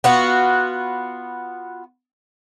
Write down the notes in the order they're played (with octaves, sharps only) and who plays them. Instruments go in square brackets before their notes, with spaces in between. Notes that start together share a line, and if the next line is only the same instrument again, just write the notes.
[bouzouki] B3 F4 F#4